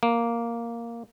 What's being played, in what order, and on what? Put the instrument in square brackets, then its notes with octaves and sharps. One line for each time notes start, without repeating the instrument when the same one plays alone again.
[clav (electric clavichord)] A#3